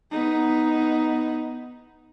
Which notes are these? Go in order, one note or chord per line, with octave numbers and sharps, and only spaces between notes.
B3 D#4